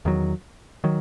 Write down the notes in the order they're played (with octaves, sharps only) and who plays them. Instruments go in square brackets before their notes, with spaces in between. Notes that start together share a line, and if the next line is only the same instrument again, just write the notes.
[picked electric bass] E2 D#3 F#3
D#3 F#3